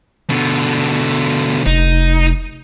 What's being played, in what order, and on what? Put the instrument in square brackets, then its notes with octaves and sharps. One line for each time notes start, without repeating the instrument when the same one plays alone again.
[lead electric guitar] B2 D3
[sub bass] F1 [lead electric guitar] D#4